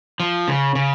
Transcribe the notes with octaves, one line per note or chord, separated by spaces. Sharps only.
F3
C#3
C#3